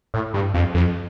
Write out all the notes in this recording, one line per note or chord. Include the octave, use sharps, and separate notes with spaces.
A2
G2
F2
F2